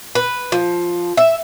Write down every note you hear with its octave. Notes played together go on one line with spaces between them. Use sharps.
B4
F3
E5